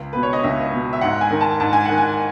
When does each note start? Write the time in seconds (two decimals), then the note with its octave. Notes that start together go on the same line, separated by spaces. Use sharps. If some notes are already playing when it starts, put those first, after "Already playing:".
Already playing: C#2
0.13 B2 B4
0.23 C#5
0.33 D#5
0.44 C#2 E5
0.73 B2
0.93 E5
1.01 G#2 F#5
1.21 G#5
1.31 D#3
1.41 A5
1.60 G#2 A5
1.73 G#5
1.85 D#3 F#5
1.98 G#5